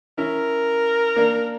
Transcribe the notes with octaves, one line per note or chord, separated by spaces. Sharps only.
C#4 E4 A#4
A#3 D4